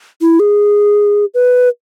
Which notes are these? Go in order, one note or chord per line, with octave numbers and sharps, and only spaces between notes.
E4
G#4
B4